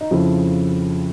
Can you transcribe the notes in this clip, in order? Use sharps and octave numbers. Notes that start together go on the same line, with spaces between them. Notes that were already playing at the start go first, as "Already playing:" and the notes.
D#4
F2 C#3 F3 E4